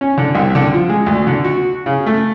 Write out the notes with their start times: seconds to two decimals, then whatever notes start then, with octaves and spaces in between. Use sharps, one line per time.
0.01 C#4
0.18 D3
0.35 C2
0.55 D3
0.73 F3
0.89 G#3
1.06 D2
1.27 D3
1.44 F#4
1.86 C#3
2.06 A3